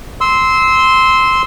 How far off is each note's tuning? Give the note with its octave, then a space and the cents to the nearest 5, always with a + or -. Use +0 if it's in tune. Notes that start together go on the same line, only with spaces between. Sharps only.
C6 -5 E6 -20